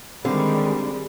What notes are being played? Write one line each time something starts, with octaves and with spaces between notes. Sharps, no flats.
D3 D#3 G3 G#3 C4 F5